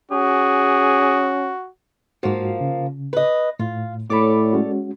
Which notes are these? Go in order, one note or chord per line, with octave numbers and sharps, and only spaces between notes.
C#4 F#4 G#4
G#2 F3 A#3 F#4
C#3
B4 D#5
A2 F4
A2 A4 C#5 D5 B5 D6
G#3 C#4 F#4